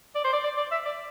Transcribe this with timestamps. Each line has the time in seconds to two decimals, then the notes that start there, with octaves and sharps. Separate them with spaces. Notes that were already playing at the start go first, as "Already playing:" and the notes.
0.15 D5
0.24 C5
0.33 D5
0.44 D5
0.57 D5
0.72 E5
0.85 D5